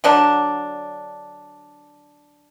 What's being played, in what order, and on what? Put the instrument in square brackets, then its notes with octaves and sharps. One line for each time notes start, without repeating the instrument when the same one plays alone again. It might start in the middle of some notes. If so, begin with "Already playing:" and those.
[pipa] D3 F#3 D4